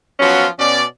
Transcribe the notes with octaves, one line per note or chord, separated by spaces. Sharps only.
F3 F#3 B3 C#4 F4 F#4
B2 C#4 D5